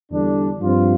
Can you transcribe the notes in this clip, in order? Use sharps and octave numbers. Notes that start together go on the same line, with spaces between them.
E2 D3 G3 D4
G2 F3 C4 F4